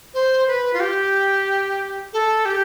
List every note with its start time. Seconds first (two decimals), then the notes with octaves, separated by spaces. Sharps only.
0.14 C5
0.48 B4
0.73 F4
0.80 G4
2.13 A4
2.45 G4